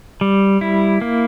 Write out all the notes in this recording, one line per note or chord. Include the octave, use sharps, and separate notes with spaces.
G3
E4
A#3